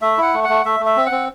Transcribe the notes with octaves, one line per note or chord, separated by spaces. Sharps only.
A3 E5
E4 F#5
A3
F#5
A3
A3 E5
A3
E5
C4
F#5
C4